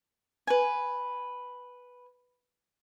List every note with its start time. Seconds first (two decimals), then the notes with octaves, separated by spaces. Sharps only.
0.47 B4 G#5